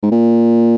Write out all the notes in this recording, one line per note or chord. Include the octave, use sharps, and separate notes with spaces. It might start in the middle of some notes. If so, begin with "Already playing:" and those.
G#2
A#2